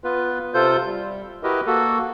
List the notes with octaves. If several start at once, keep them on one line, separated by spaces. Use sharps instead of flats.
B3 F4 B4
C3 F4 A4 C5 G6
G3
E4 F#4 G4 A#4 B4 D#5
A#3 F#4 A4